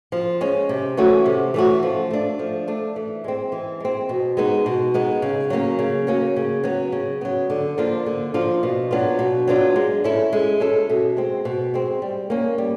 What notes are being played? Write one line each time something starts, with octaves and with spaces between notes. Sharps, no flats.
F3
G#3 C#4
C3
E3 A3 C#4 F#4
C3
E3 A3 C#4 F#4
F3
A3 D4
F3
A3 D4
E3
G#3 C4
E3
G#3 C4
B2
G#3 B3 D#4
B2
G#3 B3 D#4
C#3
F#3 A#3 C#4
C#3
F#3 A#3 C#4
C#3
F#3 B3
C#3
F#3 B3
D3
F3 A#3 D4 F4
D3
F3 A#3 D4 F4
B2
F#3 B3 D4 F4
B2
F#3 B3 D4 F4
G#3
C#4 E4 A4
G#3
C#4 E4 A4
B2
G#3 C4
B2
G#3 C4
G3
A#3 C#4
G3